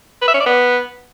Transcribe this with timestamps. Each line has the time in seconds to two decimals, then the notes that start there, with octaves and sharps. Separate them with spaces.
0.22 B4
0.28 E5
0.34 C#4
0.40 D5
0.46 B3